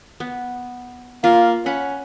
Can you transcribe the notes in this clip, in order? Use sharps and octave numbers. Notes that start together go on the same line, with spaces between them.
B3
A#3 F4
C#4 F#5 B5